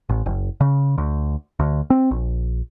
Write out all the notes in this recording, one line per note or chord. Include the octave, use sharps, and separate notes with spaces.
A1
F#1
C#3
D2
D2
C4
A#1